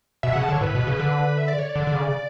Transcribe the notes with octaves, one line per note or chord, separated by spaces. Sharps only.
B2 E5
C#3 F#5
A5
D3 C#5
A2 B4
B2
C#3
D3
E5
D5
C#5
D5
D3
D3
C#3